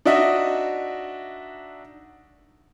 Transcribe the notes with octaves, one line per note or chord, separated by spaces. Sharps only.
D4 D#4 F#4 D#5 E5